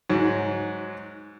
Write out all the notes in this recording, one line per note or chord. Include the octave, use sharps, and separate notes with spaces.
G#2 F#3